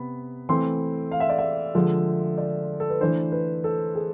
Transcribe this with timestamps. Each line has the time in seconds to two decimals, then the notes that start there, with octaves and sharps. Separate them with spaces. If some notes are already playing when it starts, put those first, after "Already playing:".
Already playing: C3 B3 B5
0.49 E3 A3 C4 C6
1.11 F5
1.20 E5
1.29 D5
1.38 E5
1.75 D3 F3 G#3
2.38 D5
2.80 A4
2.90 B4
3.01 E3 A3 D4 C5
3.32 B4
3.64 A4
3.95 G#4